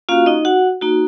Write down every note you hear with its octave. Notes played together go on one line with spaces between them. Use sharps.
A#3 C#4 F4 F#4 F5
D#4 D#5
F#4 F#5
A#3 D#4 F#4